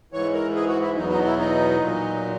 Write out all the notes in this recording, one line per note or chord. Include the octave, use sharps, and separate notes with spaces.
G#2 E3 C#5
A#4
G#4
F#4
E4
E2 B2 F#3 D#4
D#4
E4
D#4
A#2 F#3